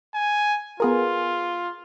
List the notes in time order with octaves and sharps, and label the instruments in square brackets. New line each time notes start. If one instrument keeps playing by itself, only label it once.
[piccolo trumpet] G#5
[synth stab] B3 G#4 A#4 [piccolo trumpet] F4